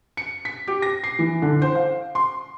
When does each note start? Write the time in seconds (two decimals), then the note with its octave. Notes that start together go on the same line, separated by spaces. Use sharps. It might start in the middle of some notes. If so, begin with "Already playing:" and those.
0.17 C#7
0.45 B6
0.67 G4
0.82 A#6
1.04 C7
1.19 E3
1.42 D3
1.62 C5
1.75 F5
2.15 C6